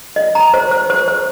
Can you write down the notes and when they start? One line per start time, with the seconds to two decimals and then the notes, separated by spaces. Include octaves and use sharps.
0.16 D#5
0.35 A#5
0.54 C5
0.71 C5
0.90 C5
1.08 C5